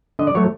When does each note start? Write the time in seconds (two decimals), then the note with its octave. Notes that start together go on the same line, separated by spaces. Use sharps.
0.19 D3 D#5
0.27 D5
0.35 F#3 A3 C#5